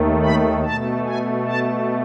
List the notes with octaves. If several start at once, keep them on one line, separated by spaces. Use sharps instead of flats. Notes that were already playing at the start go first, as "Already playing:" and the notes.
Already playing: D#2 D#3 A3
B5
B2 A3 A5
G#5
A5